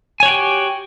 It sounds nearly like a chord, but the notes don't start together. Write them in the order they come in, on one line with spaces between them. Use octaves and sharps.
G#5 C#5 F#4 G5 G4